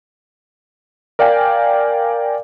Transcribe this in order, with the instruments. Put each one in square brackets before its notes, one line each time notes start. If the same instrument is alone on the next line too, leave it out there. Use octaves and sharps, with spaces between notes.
[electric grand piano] A#4 D5 F5 G5 G#5